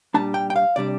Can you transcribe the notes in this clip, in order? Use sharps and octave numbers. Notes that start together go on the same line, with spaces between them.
A#2 G3 D4 A5
G5
G5
F5
C3 G3 D4 D5